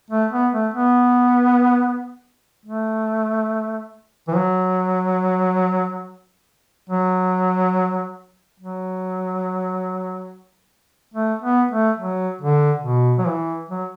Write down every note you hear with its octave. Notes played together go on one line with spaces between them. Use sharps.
A3
B3
A3
B3
A3
E3
F#3
F#3
F#3
A3
B3
A3
F#3
D3
B2
F#3
E3
F#3